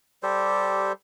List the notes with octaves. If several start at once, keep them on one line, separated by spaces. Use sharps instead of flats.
G3 G4 A4 C5